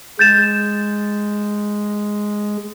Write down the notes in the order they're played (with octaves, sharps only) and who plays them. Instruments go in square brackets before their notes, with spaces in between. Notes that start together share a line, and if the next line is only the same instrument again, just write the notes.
[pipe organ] G#3 [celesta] G6 A6 E7